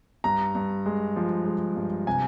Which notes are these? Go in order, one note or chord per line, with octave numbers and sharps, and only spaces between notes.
G2 A#5
G2
G#3
F3
G#3
G2
C3 G#5